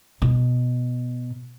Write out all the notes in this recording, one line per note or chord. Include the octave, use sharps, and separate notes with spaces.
B2